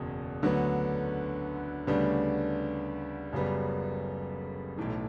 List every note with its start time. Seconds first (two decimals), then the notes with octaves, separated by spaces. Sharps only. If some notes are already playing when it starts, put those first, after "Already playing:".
Already playing: F#1 E2 B2
0.43 D2 D3 F#3 B3
1.87 D2 C#3 G3 B3 D4
3.33 F#1 F#2 C#3 G3 B3
4.78 B1 A2 E3